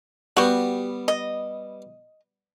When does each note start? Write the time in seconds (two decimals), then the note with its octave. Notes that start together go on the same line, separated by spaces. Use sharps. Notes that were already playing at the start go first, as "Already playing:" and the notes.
0.37 G3 B3 F#4 G4
1.08 D#5